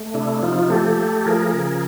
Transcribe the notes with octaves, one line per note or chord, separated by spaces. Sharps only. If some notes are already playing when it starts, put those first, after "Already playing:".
Already playing: A3
C3 D4 E4
F3 D#4 F4
A3 G4 A4
A3
F3 G#4 A#4
C#3